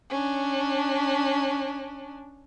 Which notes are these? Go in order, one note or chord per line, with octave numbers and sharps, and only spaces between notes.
C#4 D4